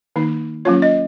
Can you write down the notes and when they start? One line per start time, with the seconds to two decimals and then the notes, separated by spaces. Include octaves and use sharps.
0.16 D#3 A#3 D#4
0.65 F#3 A#3 C#4 F4 C#5
0.82 D#5